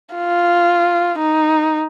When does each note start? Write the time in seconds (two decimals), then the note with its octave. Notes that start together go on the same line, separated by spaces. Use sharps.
0.15 F4
1.19 D#4